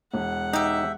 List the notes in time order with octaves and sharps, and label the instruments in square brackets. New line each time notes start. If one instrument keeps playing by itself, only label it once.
[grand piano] E1 [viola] F#5
[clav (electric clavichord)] D#4 [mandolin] G4 E5